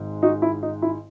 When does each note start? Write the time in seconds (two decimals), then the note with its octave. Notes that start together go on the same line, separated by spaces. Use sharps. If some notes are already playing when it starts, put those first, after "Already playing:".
Already playing: G#1 G#2
0.23 D#4 F#4
0.42 E4
0.63 D#4
0.82 E4